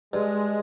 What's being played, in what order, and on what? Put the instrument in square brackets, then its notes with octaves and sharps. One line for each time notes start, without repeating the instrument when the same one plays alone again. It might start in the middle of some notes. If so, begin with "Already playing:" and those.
[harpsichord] G2 [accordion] G#3